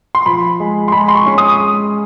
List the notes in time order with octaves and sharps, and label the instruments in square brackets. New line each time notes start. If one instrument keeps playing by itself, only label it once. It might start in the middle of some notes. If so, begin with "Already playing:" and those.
[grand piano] C6
F3 B5
G#3
C6
G#3 B5
C6
C#6
C#4
D#6
G#3